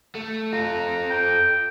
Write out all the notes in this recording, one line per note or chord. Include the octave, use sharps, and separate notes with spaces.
A3
F4 A4 A#5
G5